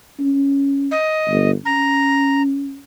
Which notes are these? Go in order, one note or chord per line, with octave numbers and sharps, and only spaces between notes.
C#4
D#5
G1
C#4 A#5